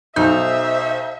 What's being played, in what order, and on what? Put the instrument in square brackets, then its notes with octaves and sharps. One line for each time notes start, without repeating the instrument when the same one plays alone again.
[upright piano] B1 G6 [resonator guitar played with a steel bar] D#4 [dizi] C5 [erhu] E5